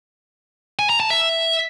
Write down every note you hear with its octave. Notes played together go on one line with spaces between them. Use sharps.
G#5
A#5
A5
E5